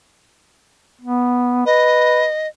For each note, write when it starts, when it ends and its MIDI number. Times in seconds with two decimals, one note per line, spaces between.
1.01 1.62 59
1.66 2.26 71
1.66 2.47 75